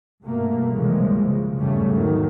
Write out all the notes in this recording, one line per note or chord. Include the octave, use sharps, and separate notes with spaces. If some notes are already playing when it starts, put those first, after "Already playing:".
G2 B2 A3 A#3
C2 C#3 E3 F3 G3 G#3
C#3
G#1 E2 C#3 G3 A3 C#4
E2 D#3 F#3